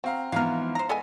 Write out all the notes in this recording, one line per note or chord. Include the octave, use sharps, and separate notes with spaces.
C4 F#4 F5 A#5
G#2 E3 F3 B3 F5 A#5 F6
C5 A#5
G#3 B3 A4 D#5 G#5